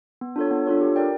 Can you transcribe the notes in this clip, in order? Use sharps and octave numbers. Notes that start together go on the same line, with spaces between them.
B3
D4 F4 A4 C#5
B3
D4 F4 A4 C#5
G4
A#4 D5 G5